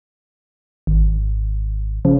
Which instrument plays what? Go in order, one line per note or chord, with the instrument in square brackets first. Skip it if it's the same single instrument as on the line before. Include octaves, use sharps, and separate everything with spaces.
[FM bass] G#1
[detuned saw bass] C#3 [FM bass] F3